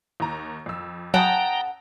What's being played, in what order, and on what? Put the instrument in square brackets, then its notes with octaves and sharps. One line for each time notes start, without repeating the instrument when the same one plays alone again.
[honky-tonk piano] D#2 A#5
F2 E6
[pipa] C#3 F#5 [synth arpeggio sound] F#3 [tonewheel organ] G5 A#5 [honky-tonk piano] A5 D#6